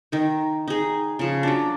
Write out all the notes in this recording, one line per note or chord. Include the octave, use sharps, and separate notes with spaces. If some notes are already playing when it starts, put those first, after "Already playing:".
D#3 D#4
D#4 G#4
C#3 F3
F#3 D4